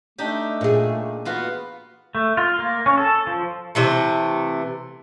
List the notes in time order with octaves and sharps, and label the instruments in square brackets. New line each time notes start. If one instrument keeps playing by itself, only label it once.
[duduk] A3 [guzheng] D4 D#4 G4
[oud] A#2 G#4
[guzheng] B3 F4 F#4 [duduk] B4
[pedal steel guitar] A3
F4
A#3
C#4
A4
F3
[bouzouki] C3 E3 A3